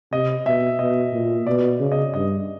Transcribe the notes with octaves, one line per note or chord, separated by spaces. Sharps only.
C3 D#5
B2 E5
B2 D#5
A#2
B2 D5
C#3
D#5
G2 D#5